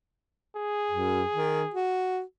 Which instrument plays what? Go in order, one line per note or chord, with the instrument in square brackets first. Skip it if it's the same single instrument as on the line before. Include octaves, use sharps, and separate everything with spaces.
[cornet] G#4
[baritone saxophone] F#2
D#3
F#4